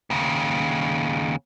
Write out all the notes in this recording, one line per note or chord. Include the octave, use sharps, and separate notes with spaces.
D#2 C#3